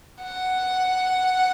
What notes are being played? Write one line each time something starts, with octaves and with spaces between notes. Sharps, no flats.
F#5